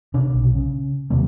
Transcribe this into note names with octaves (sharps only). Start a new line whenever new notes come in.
C3 D4
B1
C#3
D#2 C3 F#3 A#3